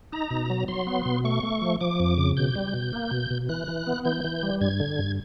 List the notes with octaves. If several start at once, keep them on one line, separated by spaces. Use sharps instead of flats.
D#4 A#5
B2
F#3
F#3 C6
B3
B2
A3 C#6
A3
F3
F3 D6
F2
C#3
B2 G6
G3
B2
A#3
B2
B2
E3 F#6
E3
B3
E3 G6
E3
G3
G2 G#6
D3
G2